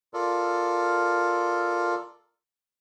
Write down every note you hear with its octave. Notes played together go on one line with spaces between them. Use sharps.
F4 A4 A#4 D5